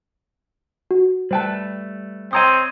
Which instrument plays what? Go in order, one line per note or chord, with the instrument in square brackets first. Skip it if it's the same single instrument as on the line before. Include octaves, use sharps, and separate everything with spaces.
[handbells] F#4
[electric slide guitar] G3 A3 B4 [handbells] C5 G5 A5
[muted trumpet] C4 [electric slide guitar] C5 C#5 D#5 [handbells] G5 A#5 D#6